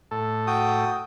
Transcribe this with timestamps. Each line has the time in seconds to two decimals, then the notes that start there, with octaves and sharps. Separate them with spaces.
0.11 A2 A4
0.47 F#4 G5 D#6